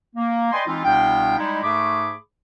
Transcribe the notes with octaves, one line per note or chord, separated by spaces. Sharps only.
A#3
B4 D5 D#5 G5 G#5 C6
E3 G#3 C4 D#4 F4
C2 B2 B3 D4 F5 G5
G3 G#3 D#4 E4
G#2 A3 G#4 B5 C#6 D6